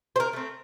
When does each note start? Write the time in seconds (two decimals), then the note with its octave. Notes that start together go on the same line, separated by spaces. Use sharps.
0.16 C5
0.20 A#4
0.33 A3 C4